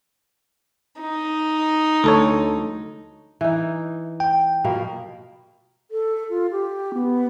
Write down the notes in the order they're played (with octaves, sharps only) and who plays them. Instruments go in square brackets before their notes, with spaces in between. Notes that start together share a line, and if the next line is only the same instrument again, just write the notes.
[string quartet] D#4
[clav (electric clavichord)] D2 A4 C#5
[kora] E3 D#4
[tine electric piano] G5
[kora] B2 F3 A#3
[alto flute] A4
F4
G4
B3